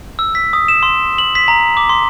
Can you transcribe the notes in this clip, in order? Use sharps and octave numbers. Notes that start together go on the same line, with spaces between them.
E6
B6
D#6
E7
C6
F#7
B6
A#5
D6
C6